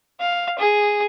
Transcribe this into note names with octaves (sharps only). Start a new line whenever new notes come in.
F5
G#4